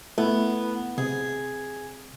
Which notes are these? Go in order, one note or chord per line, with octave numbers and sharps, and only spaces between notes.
A3 B3 E4
C3 G#4